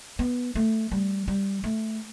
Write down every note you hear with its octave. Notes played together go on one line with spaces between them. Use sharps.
B3
A3
G3
G3
A3